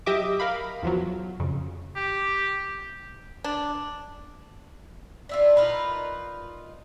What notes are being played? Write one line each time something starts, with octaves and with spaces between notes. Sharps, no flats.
F#3 G4 D#5 E5 D6
A#4 F5 B5
E2 F3 F#3
F2 C#3
G4
D4
D4 E4 F4
D#4 F4 A#4 B4